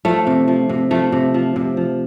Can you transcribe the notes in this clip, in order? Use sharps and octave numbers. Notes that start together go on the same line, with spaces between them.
F3 A3
C3
F3
C3
F3 A3
C3
F3
C3
F3